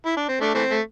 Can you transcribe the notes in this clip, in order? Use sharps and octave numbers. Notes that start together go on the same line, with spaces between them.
E4
D4
C4
A3 D4
E3 A3 C4
A3